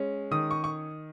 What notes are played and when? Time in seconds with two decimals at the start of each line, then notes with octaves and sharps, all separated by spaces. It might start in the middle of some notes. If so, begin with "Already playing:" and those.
Already playing: G#3 C#4
0.31 D#3 D#6
0.51 C#6
0.64 C#6